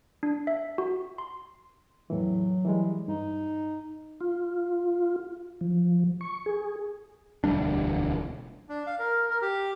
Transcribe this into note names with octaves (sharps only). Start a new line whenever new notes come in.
D4
E5
F#4
C6
E2 A2 E3 F#3
E3 G3 G#3
G2 D#4
F4
F3
C#6
G#4
E1 D2 G3 D4
D4
F5
A#4
A#4
G4